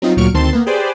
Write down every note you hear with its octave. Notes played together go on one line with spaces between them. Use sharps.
F#3 C4 D#4 F4
D2 A#2 F#3 C#6 F6 D7
D2 D#3 C4 A5 C6
A#3 B3
G4 G#4 B4 C5 D5